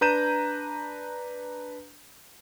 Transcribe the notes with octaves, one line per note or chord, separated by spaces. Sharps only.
D4 B4 A#5 G6 D#7 E7